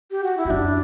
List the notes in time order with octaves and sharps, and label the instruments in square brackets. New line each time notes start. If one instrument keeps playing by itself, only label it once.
[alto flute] G4
F#4
E4
[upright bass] E2
[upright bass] F#2 [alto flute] D4